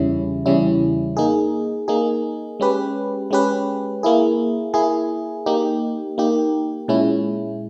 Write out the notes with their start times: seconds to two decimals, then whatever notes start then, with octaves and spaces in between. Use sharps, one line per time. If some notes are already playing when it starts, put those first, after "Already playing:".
Already playing: E2 C#3 G3 C#4 E4
0.46 E2 C#3 G3 C#4 E4
1.17 A#3 D#4 G#4
1.88 A#3 D#4 G#4
2.60 G#3 C#4 G4 B4
3.31 G#3 C#4 G4 B4
4.03 A#3 E4 G#4
4.74 A#3 E4 G#4
5.46 A#3 D#4 G4
6.18 A#3 D#4 G4
6.88 A#2 G#3 C#4 E4